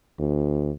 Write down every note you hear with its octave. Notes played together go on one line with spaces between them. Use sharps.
D2